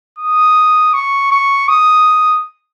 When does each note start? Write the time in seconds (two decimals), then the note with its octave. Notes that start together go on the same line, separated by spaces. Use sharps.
0.19 D#6
0.94 C#6
1.32 C#6
1.69 D#6